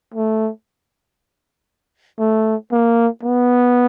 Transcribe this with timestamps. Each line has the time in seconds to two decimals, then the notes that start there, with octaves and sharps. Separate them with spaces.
0.14 A3
2.19 A3
2.72 A#3
3.23 B3